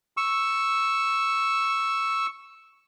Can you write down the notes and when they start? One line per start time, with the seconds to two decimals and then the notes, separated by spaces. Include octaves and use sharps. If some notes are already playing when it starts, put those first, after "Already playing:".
0.17 C#6 E6